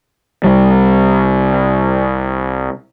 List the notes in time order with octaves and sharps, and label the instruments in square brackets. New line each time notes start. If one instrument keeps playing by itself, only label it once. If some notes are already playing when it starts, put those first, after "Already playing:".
[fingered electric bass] C2 G3